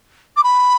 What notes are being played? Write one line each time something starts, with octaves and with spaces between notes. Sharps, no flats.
D6
B5